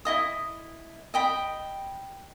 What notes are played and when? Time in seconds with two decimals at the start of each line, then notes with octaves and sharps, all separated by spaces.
0.05 E4 D#5 D#6
1.14 D#5 G5 B5